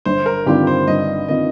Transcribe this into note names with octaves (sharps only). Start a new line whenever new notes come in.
G1 C5
A#4
G2 D#3 C4 F4 G4
C5
G1 D#5
D#3 C4 F4 D#5